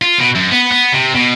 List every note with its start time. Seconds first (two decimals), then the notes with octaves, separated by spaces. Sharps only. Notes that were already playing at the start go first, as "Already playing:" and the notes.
0.02 F4
0.19 B2
0.35 F#2
0.51 B3
0.71 B3
0.93 C3
1.15 B2